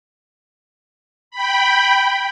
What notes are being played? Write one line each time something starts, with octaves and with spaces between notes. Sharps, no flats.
G5 B5